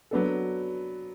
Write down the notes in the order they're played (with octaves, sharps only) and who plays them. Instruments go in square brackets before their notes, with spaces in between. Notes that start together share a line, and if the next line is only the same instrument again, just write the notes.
[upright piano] F#3 B3 D4 A4